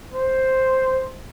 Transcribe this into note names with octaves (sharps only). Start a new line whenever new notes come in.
C5